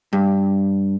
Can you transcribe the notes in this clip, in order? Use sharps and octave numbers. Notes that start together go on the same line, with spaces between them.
G2